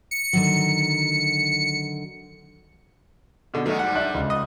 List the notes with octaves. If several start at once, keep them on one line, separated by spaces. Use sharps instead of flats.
C#7
D3 D#3 F#3
B2 D3
F#2 D#3 F#3 A3 D#4
G#2 F#3 G3 F#5
D4 E5 F#6
C#2
D#5